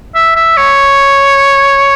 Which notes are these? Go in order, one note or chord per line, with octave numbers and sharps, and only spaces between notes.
E5
E5
C#5